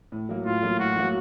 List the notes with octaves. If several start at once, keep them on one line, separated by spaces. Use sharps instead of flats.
A2
F#3 A#3
A2 F4
F#3 A#3
A2 F#4
F#3 A#3